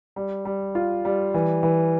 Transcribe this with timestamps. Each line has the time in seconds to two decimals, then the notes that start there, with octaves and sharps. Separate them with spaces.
0.16 G3
0.45 G3
0.75 F4
1.05 G3
1.34 E3
1.63 E3